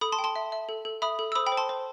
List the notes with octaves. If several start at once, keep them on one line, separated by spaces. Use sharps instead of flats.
A4 B5 D#6
A5 C6
G5
A5 C6
E5
E5
A4
A4
E5 B5 D#6
A4
E6
C5 B5 D#6
G5 B5
C5
A5 C6
C5